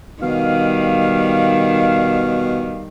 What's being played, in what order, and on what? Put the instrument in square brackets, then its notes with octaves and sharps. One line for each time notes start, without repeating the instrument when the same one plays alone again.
[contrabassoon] B2 [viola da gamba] D#3 G3 [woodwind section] F5